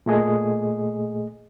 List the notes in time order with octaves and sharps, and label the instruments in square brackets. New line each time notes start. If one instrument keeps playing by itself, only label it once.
[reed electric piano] A#2 A3 G#4 D#5